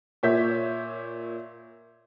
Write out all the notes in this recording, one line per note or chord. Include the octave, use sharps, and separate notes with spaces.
A#2 C#5 E5 G6 B6